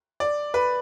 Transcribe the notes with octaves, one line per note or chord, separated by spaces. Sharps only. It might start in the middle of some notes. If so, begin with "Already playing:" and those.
D5
B4